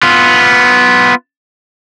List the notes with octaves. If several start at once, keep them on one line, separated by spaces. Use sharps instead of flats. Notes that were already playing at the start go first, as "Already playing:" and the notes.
B3 F4